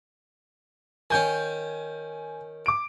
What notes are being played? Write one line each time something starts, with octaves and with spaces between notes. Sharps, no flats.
D#3 C#4 G#5 G6
D6 D7